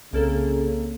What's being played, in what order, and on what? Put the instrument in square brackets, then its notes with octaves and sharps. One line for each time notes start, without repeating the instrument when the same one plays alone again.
[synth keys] C2 A#3 A4 [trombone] C#3